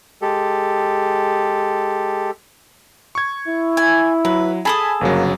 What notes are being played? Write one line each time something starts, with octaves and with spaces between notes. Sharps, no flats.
G#3 G4 A4
C#6 G#6
E4
G#5
F#3 B4
G#4 A4 G#5 A5 B5 D#6
G1 C#3 F#3 A#3